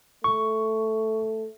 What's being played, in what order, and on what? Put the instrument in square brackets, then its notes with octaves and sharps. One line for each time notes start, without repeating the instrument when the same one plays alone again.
[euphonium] A3 [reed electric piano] C#6